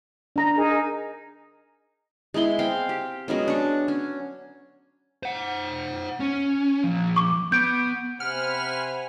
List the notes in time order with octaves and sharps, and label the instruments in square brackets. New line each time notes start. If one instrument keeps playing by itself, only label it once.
[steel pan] D4 A#5
[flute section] D#4 G#4 A#4
[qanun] G#3 B3 E4 C6
C4 F5 G5
G4
F#3 G#3 B3 C#4
D4 C#6
C#4
[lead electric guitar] C5 F#5
C#4
A#2 F3
[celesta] C#6 D6
[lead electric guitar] B3 [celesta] G6 D7
[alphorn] C3 [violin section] C5 G#5 B5 [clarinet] F#5 [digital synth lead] F6